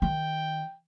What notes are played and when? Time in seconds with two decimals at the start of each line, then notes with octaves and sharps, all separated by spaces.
0.02 D#3 G5